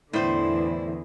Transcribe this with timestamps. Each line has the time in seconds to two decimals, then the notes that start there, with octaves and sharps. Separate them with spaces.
0.13 E2 A2 D3 E4 C5 D5